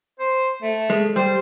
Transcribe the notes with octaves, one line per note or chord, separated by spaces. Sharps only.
C5
A3
G#3
G3 C5